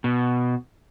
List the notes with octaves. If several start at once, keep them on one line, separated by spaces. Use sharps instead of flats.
B2